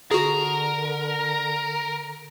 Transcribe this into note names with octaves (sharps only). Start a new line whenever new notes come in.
D3 F#4 G#4 A#4